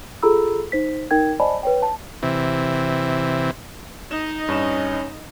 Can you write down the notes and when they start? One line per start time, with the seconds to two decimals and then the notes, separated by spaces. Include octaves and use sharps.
0.23 F4 G#4 A4 A#5 B5 E6
0.72 D#4 C5 B6
1.11 D#4 A#4 G5 G#6
1.40 C5 D5 D#5 G#5 A5 B5
1.63 B4 C#5 G5
1.82 A5
2.23 C3 E3
4.11 D#4 D#5 E7
4.48 G2 C#4 E7